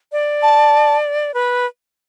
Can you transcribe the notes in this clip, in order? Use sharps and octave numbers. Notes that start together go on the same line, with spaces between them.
D5
A5
B4